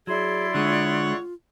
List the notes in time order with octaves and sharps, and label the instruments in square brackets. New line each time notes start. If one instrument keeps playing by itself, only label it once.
[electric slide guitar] F#3 [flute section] E4 D5 C6 [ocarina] G#4
[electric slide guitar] D3 G#3 [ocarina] F4 [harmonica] C#5 F#5 C#6